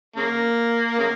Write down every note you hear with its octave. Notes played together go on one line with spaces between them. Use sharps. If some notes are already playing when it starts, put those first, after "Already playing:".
C#3 A#3
C#3 A#3